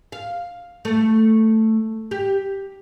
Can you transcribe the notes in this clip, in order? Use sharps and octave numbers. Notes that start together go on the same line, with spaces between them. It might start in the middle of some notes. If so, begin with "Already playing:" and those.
F5
A3
G4